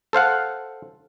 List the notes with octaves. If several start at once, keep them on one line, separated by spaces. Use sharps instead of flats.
A4 C5 F5 F#5